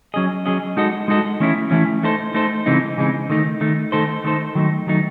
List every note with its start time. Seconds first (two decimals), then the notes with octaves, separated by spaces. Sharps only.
0.14 F#3 C#4 G#4 D#5
0.46 F#3 C#4 G#4 D#5
0.77 G#3 D#4 F#4 A4 D#5
1.08 G#3 D#4 F#4 A4 D#5
1.40 E3 A3 C#4 E4
1.71 E3 A3 C#4 E4
2.03 A3 D#4 A4 C5
2.34 A3 D#4 A4 C5
2.66 C#3 E3 G#3 C4 D#4
2.98 C#3 E3 G#3 C4 D#4
3.30 D#3 A3 D#4
3.61 D#3 A3 D#4
3.92 D#3 A3 D#4 A4 C5
4.24 D#3 A3 D#4 A4 C5
4.55 D#3 F#3 A3 D#4
4.87 D#3 F#3 A3 D#4